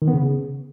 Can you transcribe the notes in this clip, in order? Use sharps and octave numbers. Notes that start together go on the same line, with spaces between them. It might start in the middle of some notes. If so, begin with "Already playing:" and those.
D#3
B3
C#3